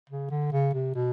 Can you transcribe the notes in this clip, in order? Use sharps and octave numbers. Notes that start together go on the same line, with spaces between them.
C#3
D3
C#3
C3
B2